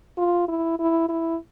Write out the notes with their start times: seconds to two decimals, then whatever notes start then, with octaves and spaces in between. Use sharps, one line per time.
0.17 F4
0.48 E4
0.79 E4
1.09 E4